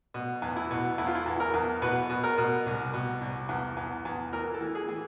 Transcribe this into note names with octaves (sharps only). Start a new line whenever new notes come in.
B2
E2
E4
B2
E2 E4
F4
E4
E2
A#4
E2
B2 B4
B2
A#4
B2
C2
B2
C2
E2
E2
E2
E3 A#4
A4
E3
G#4
E3